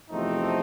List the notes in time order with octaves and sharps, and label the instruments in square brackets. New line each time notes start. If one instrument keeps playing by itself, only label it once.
[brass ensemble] E2 C3 F3 A3 C4 D#4